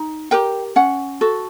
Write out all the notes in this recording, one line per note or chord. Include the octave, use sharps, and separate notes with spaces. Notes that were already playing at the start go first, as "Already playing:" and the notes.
Already playing: D#4
G4 A#4 G5
C#4 F#5
F#4 A4